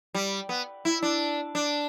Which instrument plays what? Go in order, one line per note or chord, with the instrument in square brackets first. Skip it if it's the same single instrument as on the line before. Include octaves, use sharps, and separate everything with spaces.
[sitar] G3
B3
E4
D4
D4